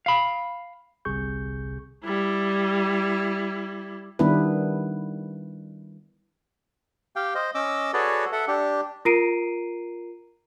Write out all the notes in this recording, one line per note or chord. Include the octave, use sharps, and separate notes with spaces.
F5 B5
G1 C2 C3 G#4 C#6 G6
G3 E4
D#3 G3 B3 D4 E4 B4
G4 F5 G5
C5 D#5
C#4 D#5 D6 E6
F#4 G#4 A4 B4 C#5 D5
A4 E5 F#5
D4 G4
F4 A#4 A#5 C7 D7 D#7